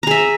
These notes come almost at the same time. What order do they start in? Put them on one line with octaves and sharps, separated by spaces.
A#5 G#4 E5